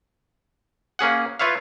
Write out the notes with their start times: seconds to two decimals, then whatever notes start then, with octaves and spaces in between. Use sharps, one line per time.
0.99 A#3 C#4 G#4 F#5
1.39 F4 B4 C#5 E5 F5